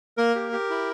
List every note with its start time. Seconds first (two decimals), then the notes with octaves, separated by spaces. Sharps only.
0.17 A#3 A#4
0.35 G4
0.52 G4
0.70 E4